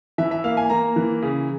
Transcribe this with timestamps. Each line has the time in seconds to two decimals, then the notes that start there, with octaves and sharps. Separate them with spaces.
0.18 E3 E5
0.31 E5
0.44 A#3 F5
0.57 G#5
0.70 A#3 A#5
0.96 E3
1.22 C#3